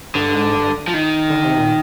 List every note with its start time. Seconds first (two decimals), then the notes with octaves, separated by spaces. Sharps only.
0.15 G2 D3
0.34 G#2
0.54 G2
0.87 F3
0.94 D#3
1.30 D3
1.45 C3
1.58 A#2